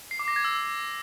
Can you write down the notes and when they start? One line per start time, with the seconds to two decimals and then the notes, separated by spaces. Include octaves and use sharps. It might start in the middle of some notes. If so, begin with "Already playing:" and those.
0.11 C7
0.19 D6
0.28 A#6
0.36 G#6
0.44 E6